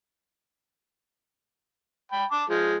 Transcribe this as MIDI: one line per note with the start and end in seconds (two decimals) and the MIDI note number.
2.12 2.25 79
2.12 2.25 83
2.31 2.44 81
2.31 2.44 86
2.50 2.76 53
2.50 2.76 56